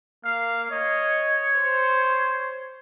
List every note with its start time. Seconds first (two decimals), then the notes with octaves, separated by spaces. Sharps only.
0.25 A#3 F5
0.71 C#5 D#5
1.55 C5